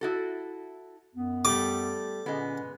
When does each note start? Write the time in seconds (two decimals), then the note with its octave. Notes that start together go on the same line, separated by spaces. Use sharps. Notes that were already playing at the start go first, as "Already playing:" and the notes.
0.01 E4 F#4 A4
1.15 F#2 B3
1.45 G3 A3 D6
2.26 A#2 D3 G#3 B3 C#4